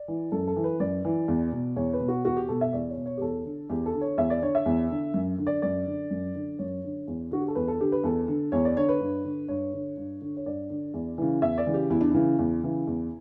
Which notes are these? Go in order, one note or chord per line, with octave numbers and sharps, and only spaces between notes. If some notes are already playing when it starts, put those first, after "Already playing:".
Already playing: D5
E3
F#2 A4
A4
E3
B4
F#2 D5
E3
E2
B2
E2 C#5
B4
B2
F#4
E2 F#4
G4
B2 A4
E5
E2 D5
C#5
B2
C#5
G4
E2 A4
D3
E2 G4
A4
D3
C#5
E2 E5
D5
D3 C#5
E5
E2
D3
F#2
D3
D5
F#2 D5
D3
F#2
D3
F#2 C#5
D3
E2
D3 F#4
G4
A4
E2 B4
A4
D3 G4
B4
E2 A4
D3
E2 C#5
D5
D3 C#5
B4
G2
D3
G2 C#5
D3
G2
D3
C#5
G2 D5
D3
E2
C#3 E3
E2 E5
D5
C#3 E3
G4
E2 E4
D4
C#3 E3 E4
E2
C#3 E3
E2